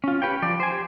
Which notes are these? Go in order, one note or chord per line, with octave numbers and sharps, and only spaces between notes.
C#4 F4
G4 B4 C#5 G5
F3 D5
C5 G#5
G4